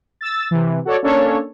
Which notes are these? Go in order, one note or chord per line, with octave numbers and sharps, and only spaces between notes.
E6 A6
C3 E3
F#4 A4 C#5 D5
A#3 C#4 D4 A4 C#5